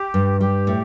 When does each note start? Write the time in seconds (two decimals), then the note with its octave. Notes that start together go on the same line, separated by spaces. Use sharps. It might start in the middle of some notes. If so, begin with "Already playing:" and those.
Already playing: G4
0.14 G2
0.41 G3 G4
0.67 A2